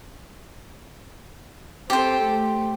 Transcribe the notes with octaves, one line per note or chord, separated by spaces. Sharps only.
C4 G4 A4 C5
A3